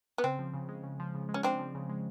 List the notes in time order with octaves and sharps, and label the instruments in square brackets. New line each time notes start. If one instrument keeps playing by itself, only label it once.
[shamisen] B3
[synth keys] C#3 [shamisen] C4
[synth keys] F3
C#3
G#3
C#3
F3
C#3
G#3
[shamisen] C#4
[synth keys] C#3 [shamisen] C4 D4
[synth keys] F3
C#3
G#3